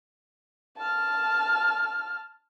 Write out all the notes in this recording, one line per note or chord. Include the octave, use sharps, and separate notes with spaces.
A5 F6